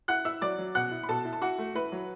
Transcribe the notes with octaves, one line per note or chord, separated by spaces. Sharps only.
E4 F#5 F#6
E4 E5 E6
F#3 D5 D6
F#3
B2 F#5 F#6
E4
B5
B2 A4 A5
E4
A5
E4 F#4 F#5
A3
E4 B4 B5
F#3